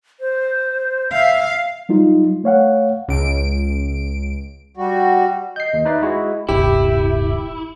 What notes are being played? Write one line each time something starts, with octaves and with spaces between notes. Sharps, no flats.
C5
E5 F5
F#3 G3 D#4 F4
A3 C#5 F5 F#5
C#2 D7
G3 F#4
D#5 G6 C7
D#2
D#4 B4 D5 E5
G#3 E4 F#4 G#4
D1 G1 C3 E4 G4